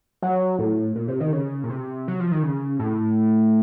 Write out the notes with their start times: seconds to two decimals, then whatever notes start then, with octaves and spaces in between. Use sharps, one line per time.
0.22 F#3
0.59 A2
0.96 A#2
1.08 C3
1.20 D#3
1.32 C#3
1.64 A#2
1.70 C3
2.08 F#3
2.20 F3
2.32 D#3
2.43 C#3
2.79 A2